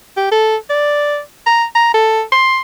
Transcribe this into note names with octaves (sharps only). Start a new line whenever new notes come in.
G4
A4
D5
A#5
A#5
A4
C6